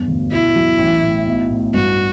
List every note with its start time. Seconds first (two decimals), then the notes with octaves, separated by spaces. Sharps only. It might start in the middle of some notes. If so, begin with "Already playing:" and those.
Already playing: E1 G2
0.08 D2
0.32 B2 E4
0.56 F#3
0.78 A1
1.03 A2
1.27 B1
1.50 A2
1.74 G2 F#4